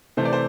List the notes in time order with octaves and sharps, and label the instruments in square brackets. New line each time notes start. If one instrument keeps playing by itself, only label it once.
[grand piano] C3 E3 A3 C5
D5
C5